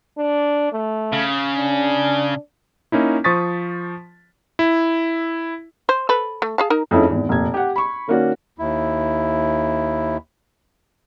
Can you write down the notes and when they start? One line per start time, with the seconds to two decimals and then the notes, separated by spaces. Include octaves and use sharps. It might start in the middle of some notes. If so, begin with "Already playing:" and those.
0.18 D4
0.73 A3
1.13 C#3
1.57 D4
2.92 A#3 C#4 D#4 E4
3.24 F3 C5 C#6 D#6 A6 B6
4.59 E4
5.89 C5
6.09 A4 B4
6.42 A3
6.58 G#4 F5 A5
6.70 D#4 A#4
6.91 F2 A3 C#4 D#4 E4 G#4
7.10 G#1 E2
7.29 F1 A#2 G#6
7.54 G4 F#5
7.76 B5 C#6
8.07 D#3 A#3 C#4 F#4 D5
8.59 D#2 E4